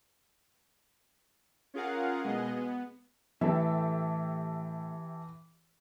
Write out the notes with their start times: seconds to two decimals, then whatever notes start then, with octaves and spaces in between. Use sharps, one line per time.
1.74 C#4 F4 G#4 A#4 F5 F#5
2.24 B2 G#3 B3 G#4 D#5
2.57 B3
3.41 A2 E3 A3 G4 A4 E5